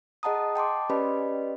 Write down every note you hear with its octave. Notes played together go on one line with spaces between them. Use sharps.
G#4 D#5 F#5 A5 A#5 D#6
G5 A5 C6 D6
C#4 G4 B4 D5 D#5 B5